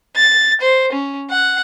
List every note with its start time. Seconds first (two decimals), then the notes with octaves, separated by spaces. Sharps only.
0.17 A6
0.62 C5
0.93 C#4
1.30 F#5